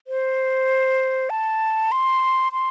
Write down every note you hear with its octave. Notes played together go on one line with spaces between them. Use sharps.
C5
A5
C6
C6